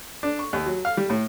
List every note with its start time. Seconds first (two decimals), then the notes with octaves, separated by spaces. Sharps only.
0.23 D4
0.39 C#6
0.53 D#2
0.66 F#3
0.85 F5
0.97 G3
1.10 A2